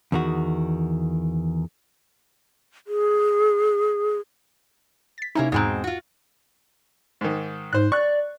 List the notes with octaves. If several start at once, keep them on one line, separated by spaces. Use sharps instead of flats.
E2 D#3 F#4
G#4
A6 B6
C3 A#3 C#4 D#4 E4
E2 G#2 B2 G#3 C4 A#5
F4 F#4
G#2 D#3
G#2 C5 F#6
D5 C#6 F#6